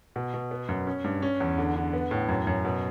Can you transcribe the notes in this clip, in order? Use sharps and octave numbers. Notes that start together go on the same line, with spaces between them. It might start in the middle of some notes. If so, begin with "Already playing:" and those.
B2
B2
B3
F#2
C#4
G2
C#4
E2
D3
D3
B3
A2
F#2
F#2
B2